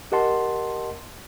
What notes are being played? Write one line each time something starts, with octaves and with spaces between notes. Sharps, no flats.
G4 A#4 D#5 F#5 A5 C6